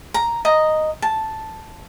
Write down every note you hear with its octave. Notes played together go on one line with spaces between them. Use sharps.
A#5
D#5 A#5
A5